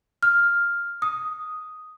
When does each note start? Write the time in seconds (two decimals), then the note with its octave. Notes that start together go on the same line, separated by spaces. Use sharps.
0.23 F6
1.02 D#6